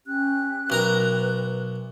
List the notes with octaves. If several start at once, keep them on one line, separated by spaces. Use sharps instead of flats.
C#4 G4 F#6
B1 A#4 B4 A#5